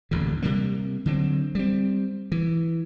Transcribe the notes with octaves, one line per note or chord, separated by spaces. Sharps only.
D#1 A1 E2 D3
C3 G3 A#3
D3 F#3 C4
G3 C4
E3